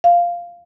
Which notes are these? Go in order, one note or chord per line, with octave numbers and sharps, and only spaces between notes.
F5